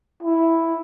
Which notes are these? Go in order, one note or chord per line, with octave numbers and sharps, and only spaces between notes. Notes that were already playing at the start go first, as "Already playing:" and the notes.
E4